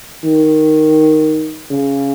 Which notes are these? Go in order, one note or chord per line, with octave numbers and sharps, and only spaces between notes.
D#3
C#3